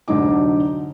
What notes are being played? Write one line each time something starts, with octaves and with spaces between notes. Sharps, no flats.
F1 D2 D3 F#3 D#4 D6